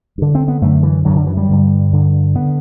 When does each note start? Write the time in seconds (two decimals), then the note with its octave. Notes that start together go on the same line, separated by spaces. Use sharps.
0.18 G2 D3
0.35 C4
0.48 B3
0.61 F#2 D3 A3
0.83 E3
1.05 D3 F#3
1.09 F#2
1.16 D3
1.27 E3
1.37 G3
1.48 G2 D3
1.93 G2 D3
2.35 D3 B3